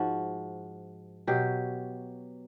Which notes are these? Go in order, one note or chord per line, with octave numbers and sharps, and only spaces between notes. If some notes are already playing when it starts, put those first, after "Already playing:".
Already playing: G#2 F3 F#4
B2 F#3 G4